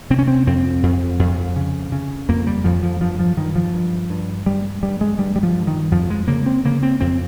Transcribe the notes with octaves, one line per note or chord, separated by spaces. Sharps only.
C3 C4
C#4
C4
F2 C4
F2
F2
C#3
C#3
F2 A#3
G3
F2 F3
F3
G2 F3
F3
G2 D#3
F3
G2
G2
G2 G3
G2 G3
G#3
G2 G3
G3
F3
G2
D#3
F2 F3
G#3
C#3 A#3
C4
C#3 A#3
C4
F2 C4